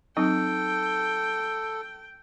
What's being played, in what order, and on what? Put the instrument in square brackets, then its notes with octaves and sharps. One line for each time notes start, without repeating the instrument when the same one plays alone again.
[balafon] F#3 C4 D#4 [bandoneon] A4 [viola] G5